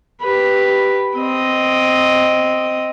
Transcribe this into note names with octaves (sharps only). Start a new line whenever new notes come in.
G4 B4
C4 D#5